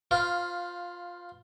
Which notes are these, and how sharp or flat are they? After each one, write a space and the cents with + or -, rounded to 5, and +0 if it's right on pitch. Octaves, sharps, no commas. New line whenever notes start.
F4 +10 C5 -45 F5 +0